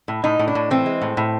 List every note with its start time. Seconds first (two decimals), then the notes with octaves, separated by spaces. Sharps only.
0.08 A2
0.24 A2 D#4
0.39 A2
0.48 D4
0.55 A2
0.70 E3 C4
0.86 G#3
1.02 A2
1.17 A2